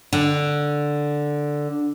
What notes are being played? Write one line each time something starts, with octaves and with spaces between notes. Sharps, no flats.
D3